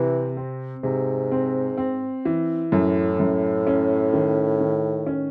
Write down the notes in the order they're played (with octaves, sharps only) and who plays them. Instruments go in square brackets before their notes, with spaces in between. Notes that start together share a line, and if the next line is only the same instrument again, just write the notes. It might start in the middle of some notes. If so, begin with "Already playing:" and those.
Already playing: [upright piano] C3 C4 [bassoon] E3
[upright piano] C4
[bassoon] G#2 [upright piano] C3
[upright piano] C4
C4
E3
[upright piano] F#2 [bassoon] A2
[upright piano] F#2
C#4
D#3
D#3
C#4